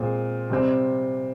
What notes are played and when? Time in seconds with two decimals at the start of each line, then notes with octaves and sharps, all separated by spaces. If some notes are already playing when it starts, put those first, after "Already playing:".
Already playing: A#2 G#3 C4
0.50 C3 G3 C4